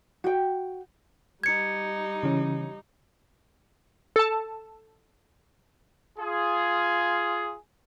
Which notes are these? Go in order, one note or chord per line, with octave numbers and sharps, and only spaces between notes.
F#4 G5
G3 D#4 G#6 C#7
C#3 E3 C#4
A4 A5
F4 G#4